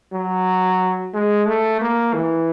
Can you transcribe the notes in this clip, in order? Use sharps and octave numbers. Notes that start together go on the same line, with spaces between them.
F#3
G#3
A3
A#3
E3